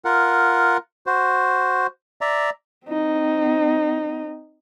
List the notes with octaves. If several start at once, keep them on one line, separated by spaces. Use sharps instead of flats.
F4 A#4 F#5
F#4 C5
D5 E5 A#5
C4 D#4